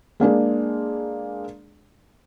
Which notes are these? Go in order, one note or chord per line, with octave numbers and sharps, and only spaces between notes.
G#3 A#3 D4 G#4